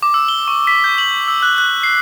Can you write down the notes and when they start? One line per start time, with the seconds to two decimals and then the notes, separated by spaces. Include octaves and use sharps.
0.03 D6
0.14 E6
0.29 G7
0.48 C#6
0.67 B6
0.84 G6
0.98 F#7
1.28 E6
1.43 F#6
1.58 F#6
1.83 C7